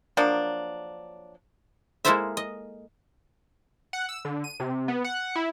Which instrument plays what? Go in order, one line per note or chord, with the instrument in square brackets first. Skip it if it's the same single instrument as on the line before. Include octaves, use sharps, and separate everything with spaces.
[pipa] F3 F#3 A#3 D4
[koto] G#3 A#3 E4 A4 C5 E5
D#5
[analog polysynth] F#5
E6
D3
D#7
C3
B3
F#5
E4